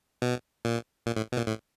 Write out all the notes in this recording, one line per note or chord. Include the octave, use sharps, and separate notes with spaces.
B2
A#2
A#2
A2
B2
A#2
A2